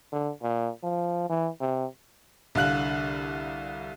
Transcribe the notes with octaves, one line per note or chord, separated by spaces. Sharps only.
D3
A#2
F3
E3
C3
C2 D3 F5 F#6 F#7